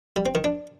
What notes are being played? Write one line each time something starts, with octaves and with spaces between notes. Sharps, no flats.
G3
C4
D#3
D4